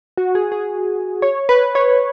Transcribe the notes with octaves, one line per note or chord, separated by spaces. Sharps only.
F#4
G#4
G#4
C#5
B4
C#5